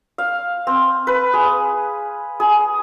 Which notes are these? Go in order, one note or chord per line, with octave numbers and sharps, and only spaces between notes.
F5
C4
B4
G#4
G#4